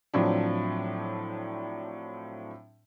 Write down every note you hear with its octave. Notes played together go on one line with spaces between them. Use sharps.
A2 F3 F#3 C4 D4